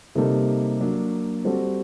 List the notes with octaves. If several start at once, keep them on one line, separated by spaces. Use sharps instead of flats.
C3 G3 A#3 D#4 A4
F#3 A#3 D4
G3 C4 F#4 A4